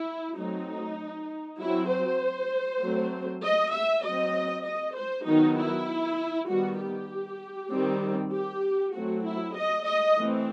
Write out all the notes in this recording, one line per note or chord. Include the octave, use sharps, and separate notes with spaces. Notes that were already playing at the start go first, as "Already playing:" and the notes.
Already playing: E4
F#3 A3 C4 D#4
F#3 C4 E4
C5
F#3 A3 C4
D#5
E5
F#3 C4 D#5
D#5
C5
D#3 F#3 B3 D#4
E4
D#3 G3 B3 F#4
G4
D#3 G3 C4
G4
F#3 A3 C4 F#4
E4
D#5
D#5
E3 A3 C4